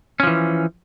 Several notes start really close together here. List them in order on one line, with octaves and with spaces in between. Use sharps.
C#4 F3 E3